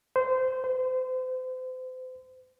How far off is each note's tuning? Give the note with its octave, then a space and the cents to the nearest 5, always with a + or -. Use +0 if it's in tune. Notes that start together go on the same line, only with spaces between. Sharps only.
C5 -20
C5 -35